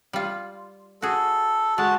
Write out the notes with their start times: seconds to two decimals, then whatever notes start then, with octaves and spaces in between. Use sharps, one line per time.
0.13 G3 F4
1.02 F#4 G#4 A4
1.78 G#3 F#4 A5